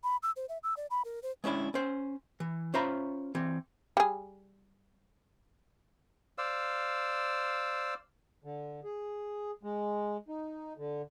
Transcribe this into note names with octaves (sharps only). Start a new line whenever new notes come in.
B5
E6
C5
E5
E6
D5
B5
A#4
C5
G#3 C#4 D4 E4 D5
C#4 C5
E3
C#4 F4 C5 E5 A#5 B5
E3 C4
G3 G#4
C5 D5 F5 E6
D3
G#4
G#3
D#4
D3